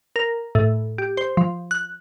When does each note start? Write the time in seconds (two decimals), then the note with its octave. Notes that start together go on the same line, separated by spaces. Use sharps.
0.16 A#4
0.55 A2
0.98 G4
1.17 C5
1.37 F3
1.71 F#6